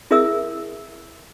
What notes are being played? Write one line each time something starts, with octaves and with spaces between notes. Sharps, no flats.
E4 G#4 A#4 E5 D#6 E6